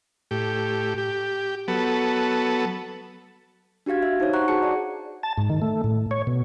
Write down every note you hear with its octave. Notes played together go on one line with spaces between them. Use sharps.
A2 G4
G4
F#3 B3 A4
D4 F#4 G4 F5 G#6
E5
D#4 C5 C#5
C#5 F#5 A#5 C#6 F#6
F#4 G#4 A5 C#7
D5
A5
G#2
D#3
A3
A2
C#5
B2